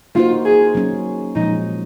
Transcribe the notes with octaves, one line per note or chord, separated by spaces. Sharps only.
A#3 D#4 F4 F#4 C5
G#4
F#3 A#3 C#4
A#2 F3 G#3 D#4